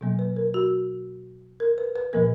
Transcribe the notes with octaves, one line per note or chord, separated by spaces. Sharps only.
B2 F#3 A#3
B4
A#4
F#4
A#4
B4
B4
A#2 F3 A#3 A#4